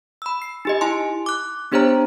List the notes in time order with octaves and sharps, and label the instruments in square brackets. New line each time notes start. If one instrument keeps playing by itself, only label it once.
[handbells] B5 E6
C7
D#4 G4 D#5
E4 G#5 A5 C6
D6 F#6
B3 D4 G4 C5 C#5 A#5